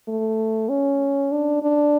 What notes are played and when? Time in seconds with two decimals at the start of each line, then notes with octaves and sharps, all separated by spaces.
0.09 A3
0.69 C#4
1.32 D4
1.62 D4